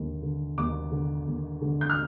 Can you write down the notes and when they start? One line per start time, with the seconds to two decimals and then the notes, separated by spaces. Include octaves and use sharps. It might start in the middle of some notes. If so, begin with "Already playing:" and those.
Already playing: D#2 D3
0.22 D3
0.58 D#2 D6
0.92 D3
1.27 D#2
1.62 D3
1.81 G6
1.90 F6